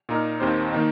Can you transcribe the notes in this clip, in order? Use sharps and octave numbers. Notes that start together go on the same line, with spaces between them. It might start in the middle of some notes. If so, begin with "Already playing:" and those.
A#2 A#3 D#4 A#4
D#2 D#3 C4 G4 C5
D#3 A#3 D#4